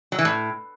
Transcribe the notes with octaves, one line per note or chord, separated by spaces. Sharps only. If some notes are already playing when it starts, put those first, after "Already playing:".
F#3
E3
A2